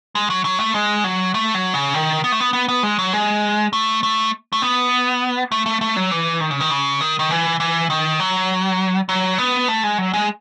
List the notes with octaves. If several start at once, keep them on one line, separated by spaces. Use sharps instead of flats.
G#3
F#3
F#3
A3
G#3
F#3
A3
F#3
C#3
D#3
B3
A3
B3
B3
B3
G#3
F#3
G#3
A3
A3
A3
B3
A3
A3
A3
F#3
E3
D#3
C#3
D#3
C#3
D#3
D#3
E3
E3
D#3
F#3
F#3
B3
A3
G#3
F#3
G#3